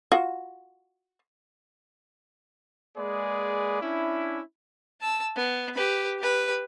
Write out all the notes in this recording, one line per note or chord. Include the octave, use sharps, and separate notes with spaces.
F4 F#4
G#3 A#3 G#4 B4 D5
C#4 D4 E4
A5 E6
B3
G4 B4
G4 B4